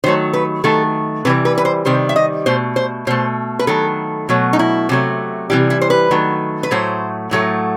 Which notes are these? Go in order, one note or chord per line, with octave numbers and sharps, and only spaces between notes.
D#3 F#3 A3 C5
B4
D#3 F#3 A3 A4
C3 E3 G3 B4
B4
B4
C5
C3 D#3 G3 C5
E5
D#5
B2 A3 C5
C5
B2 A3 C5
B4
D#3 F#3 A3 A4
B2 F#3 A3
D#4
E4
C3 F#3 A3
C3 E3 G3 G4
E4
C5
B4
D#3 F#3 A3
B4
A2 F#3 A3 C5
A2 F#3 A3